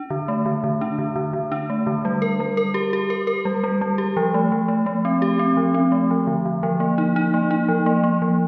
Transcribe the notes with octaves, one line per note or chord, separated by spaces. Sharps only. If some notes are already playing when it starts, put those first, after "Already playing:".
Already playing: D4
D3
A3
D3
D3
D4
D3
D3
D3
D4
A3
D3
G3
A#4
G3
A#4
G4
G4
A#4
A#4
G3
G3
G3
G4
F3
A3
F3
A3
A3
C4
G4
C4
F3
C4
A3
F3
D3
D3
F3
A#3
D#4
D#4
A#3
D#4
F3
A#3
A#3
F3